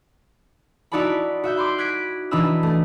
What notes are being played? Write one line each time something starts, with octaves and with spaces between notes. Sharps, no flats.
D#4 E4 F#4 D5 A5 B5
F#4 E5 G6
B5 C6 D6
F#6 G#6 A#6 B6 D7
E3 D4 D#4 D#5 B5 E6
A3